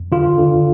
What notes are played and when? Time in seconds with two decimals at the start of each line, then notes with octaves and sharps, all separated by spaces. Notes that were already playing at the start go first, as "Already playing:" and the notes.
Already playing: F2
0.12 D3 F4
0.39 D3